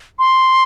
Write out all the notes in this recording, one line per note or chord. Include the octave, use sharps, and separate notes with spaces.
C6